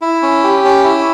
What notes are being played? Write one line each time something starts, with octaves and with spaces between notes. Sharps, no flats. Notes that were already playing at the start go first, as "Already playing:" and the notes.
E4
C#4
G4
C#4
E4